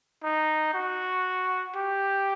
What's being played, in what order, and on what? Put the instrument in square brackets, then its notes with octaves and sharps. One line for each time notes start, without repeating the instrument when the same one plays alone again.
[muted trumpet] D#4
F#4
G4